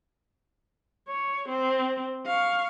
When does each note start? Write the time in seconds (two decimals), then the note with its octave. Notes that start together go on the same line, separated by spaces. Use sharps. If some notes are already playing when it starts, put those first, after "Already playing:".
1.08 C#5
1.49 C4
2.26 F5 C#6